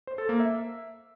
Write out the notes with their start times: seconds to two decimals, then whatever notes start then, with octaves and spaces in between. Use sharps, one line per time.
0.07 C5
0.18 A4
0.29 A#3
0.40 E5